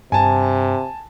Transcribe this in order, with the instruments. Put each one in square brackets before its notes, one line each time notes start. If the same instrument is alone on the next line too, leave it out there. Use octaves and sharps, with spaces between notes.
[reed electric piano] G2 [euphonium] C3 [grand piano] G#5 A5